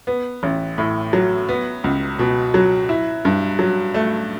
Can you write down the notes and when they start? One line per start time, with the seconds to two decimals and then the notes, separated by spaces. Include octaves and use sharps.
0.07 B3
0.43 A1
0.78 A2
1.13 F#3
1.49 B3
1.84 C#2
2.19 B2
2.54 F#3
2.89 E4
3.25 G2
3.59 F#3
3.94 A3